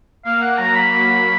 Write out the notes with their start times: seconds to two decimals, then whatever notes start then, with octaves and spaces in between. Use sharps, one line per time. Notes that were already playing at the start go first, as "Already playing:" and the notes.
0.25 A#3 F5
0.41 F#5
0.57 F#3 A#5
0.75 B5
0.92 F#3